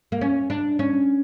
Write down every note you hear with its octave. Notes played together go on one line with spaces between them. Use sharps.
A#3
C#4
D4
C#4